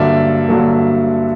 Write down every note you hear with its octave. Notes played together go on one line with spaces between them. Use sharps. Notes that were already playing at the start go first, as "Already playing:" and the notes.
Already playing: G2 D3 F#3 A#3 D5 E5
G2 D3 F#3 A#3